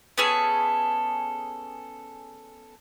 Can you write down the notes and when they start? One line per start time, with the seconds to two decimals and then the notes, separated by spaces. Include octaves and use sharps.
0.18 B3 C#4 G#4 A4